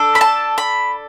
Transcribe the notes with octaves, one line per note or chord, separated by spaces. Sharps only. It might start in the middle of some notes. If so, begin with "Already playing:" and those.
Already playing: D4 A4
B5
A5
B5